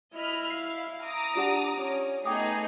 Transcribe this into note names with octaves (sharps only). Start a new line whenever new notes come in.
E4 D#5 B5 F6
F5 C7
A#5 D6 D#6
D4 F4 G4 F#5
C#4
A3 B3 D#4 G#4 G5 D6 D#6